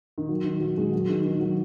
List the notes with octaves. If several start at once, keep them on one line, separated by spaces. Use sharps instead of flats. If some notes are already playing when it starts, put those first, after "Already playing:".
D#3
F#3
D#3
F#3
G#3
F#3
D#3
D#3
F#3